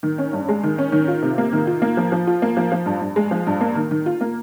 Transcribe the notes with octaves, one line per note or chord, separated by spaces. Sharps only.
D#3
C#4
G2
G#3
D#3
C#4
D#3
F4
C3
A#3
D#3
F4
A#3
F3
F3
F4
A#3
F3
F3
G2
G2
G#3
F3
G2
A#3
D#3
D#3
F4
A#3